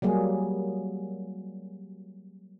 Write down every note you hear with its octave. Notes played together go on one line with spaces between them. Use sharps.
F#3 G3 A#3 G#4